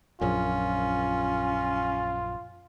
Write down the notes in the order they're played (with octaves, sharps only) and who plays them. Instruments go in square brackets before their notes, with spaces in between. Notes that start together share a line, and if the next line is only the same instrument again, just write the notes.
[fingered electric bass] A#1 F#2 [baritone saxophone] C#4 [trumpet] F4